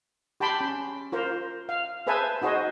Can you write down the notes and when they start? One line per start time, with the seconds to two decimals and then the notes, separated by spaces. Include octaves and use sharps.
0.40 G4 G5 A5 B5 C6
0.61 C#4
1.12 F4 A#4 C5
1.69 F5
2.07 G#4 B4 C5 E5 G#5 A5
2.42 D#4 F#4 G#4 C5 D#5